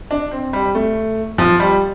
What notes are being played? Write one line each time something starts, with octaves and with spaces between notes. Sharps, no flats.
D4
C4
G3
A3
F3
G3